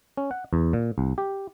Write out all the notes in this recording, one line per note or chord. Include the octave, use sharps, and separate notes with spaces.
C#4
F#5
E2
A#2
C2
G4